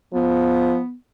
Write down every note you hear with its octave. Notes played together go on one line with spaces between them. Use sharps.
F3 B3